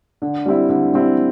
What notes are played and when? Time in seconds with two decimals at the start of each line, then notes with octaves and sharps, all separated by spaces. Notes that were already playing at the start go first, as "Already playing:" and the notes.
0.22 D3
0.46 G3 C4 E4
0.69 D3
0.93 G3 C4 E4